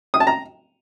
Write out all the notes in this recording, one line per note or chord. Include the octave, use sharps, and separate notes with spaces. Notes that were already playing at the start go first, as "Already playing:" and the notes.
D#6
A5
A#5